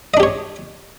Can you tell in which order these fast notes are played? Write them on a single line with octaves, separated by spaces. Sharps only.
D#5 D4 G4 C#5